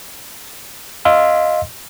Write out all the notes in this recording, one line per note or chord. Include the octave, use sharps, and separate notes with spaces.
D#5 F5 C6 E6